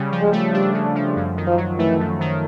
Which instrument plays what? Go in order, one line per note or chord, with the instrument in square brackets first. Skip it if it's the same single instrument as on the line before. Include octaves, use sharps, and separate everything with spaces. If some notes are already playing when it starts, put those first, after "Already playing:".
Already playing: [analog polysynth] C#3 G3
F3
[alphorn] G#3
[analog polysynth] A3
[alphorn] G3 [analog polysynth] D4
[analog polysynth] C#3
F3
F#2
D#3
[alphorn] F3
[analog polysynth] F#3
[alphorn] E3 [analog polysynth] A3
[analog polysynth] F#2
D#3